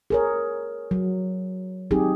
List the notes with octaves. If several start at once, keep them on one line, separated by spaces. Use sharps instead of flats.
G#4 A#4 C#5
F#3
F#3 C4 D#4 G4 G#4